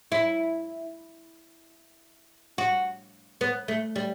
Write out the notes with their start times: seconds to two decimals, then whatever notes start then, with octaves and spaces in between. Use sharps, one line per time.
0.12 E4
2.58 F#4
3.41 B3
3.68 A3
3.96 G3